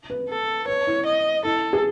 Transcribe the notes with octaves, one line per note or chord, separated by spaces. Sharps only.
B4
A4
B4 C#5
E4
D#5
E4 A4
G#4